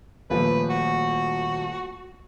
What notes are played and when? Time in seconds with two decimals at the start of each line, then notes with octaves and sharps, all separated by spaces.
0.30 D#1 F3 A3 B4
0.70 F#4